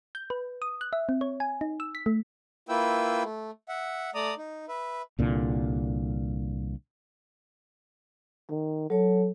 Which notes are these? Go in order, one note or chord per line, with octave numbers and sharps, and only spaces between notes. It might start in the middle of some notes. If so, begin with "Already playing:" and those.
G6
B4
D#6
F#6
E5
C4
C#5
G#5
D#4
E6
B6
A3
A#3 E4 F4 B4 G5 E6
A3
E5 F#5
A3 D5 A#5 D#6
D#4
B4 E5
C2 A#2 D3
D#3
F#3 A4 C#5